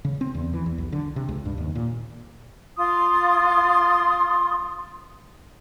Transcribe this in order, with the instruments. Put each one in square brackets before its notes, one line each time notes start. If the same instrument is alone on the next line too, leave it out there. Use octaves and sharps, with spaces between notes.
[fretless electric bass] C#3
C4
E2
E3
E2
B1
D3
C3
C#2
G2
D#2
A#2
[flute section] F4 C6 D#6